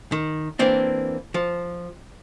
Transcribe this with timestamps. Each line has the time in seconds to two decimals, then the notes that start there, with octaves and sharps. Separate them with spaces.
0.12 D#3
0.59 E3 A#3 C4 D4
1.34 F3